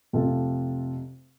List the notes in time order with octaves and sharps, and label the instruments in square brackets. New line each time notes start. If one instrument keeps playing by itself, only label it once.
[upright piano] F2 C3 A3 F4 A4